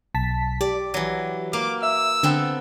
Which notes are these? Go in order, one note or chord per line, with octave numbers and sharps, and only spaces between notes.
B1 A5 B6
G4 D5
E3 F#3
A#3 F5 D6
E5 E6
D3 B3 C4 A4